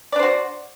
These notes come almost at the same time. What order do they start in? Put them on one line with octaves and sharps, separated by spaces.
D5 D4 C5 F#4